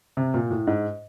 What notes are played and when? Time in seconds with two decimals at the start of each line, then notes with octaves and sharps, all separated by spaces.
0.17 C3
0.34 A#2
0.51 A2
0.67 G#2